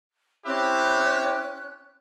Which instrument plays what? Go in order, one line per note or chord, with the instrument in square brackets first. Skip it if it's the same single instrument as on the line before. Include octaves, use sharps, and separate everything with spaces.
[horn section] C4 E4 G4 [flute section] C#4 F#6